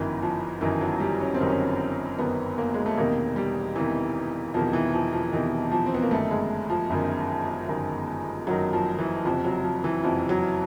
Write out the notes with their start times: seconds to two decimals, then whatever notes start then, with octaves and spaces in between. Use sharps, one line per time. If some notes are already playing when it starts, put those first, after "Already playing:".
Already playing: G1 F#2 D#3 E3
0.22 F3
0.61 G1 F#2 D#3 E3
0.81 F#3
1.00 G3
1.20 C#4
1.34 C4
1.40 G1 F#2 D#3
1.49 C#4
2.19 G1 F#2 D#3 B3
2.58 A#3
2.74 G#3
2.86 A3
2.97 E1 E2 C3 D#3 A#3
3.36 G3
3.76 E1 E2 C3 D#3 E3
4.54 E1 E2 C3 D#3 F3
4.73 E3
4.93 F3
5.13 F3
5.32 E1 E2 C3 D#3 E3
5.71 F3
5.86 C4
5.94 B3
6.02 A#3
6.11 G1 F#2 D#3 A3
6.31 G#3
6.70 F3
6.90 G1 F#2 D#3
7.68 G1 F#2 D#3
8.47 G1 F#2 D#3 F#3
8.73 F3
8.99 E3
9.25 F#1 F2 C3 F3
9.44 F#3
9.64 F3
9.84 E3
10.04 F#1 F2 C3 F3
10.29 F#3